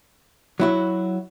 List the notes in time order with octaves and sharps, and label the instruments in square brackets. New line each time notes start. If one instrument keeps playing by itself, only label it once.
[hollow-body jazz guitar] F#3 E4 F#4